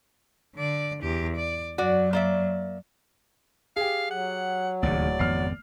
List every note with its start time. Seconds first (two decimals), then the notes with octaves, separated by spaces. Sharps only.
0.56 D3 D5
1.02 E2 G4
1.36 D5
1.78 F#2 F#3 F#4 D5
2.13 A#3 D5 E5
3.76 G4 G#4 F5
4.11 F#3 F#5
4.83 D1 D#2 C#3 D5
5.19 G#1 F2 B3 F6 C7